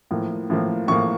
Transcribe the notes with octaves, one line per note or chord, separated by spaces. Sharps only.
A2 F3 A#3
A2 F3 A#3
A2 F3 A#3 C#6